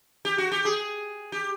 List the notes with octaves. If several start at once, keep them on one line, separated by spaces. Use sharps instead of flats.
G4
F#4
G4
G#4
G4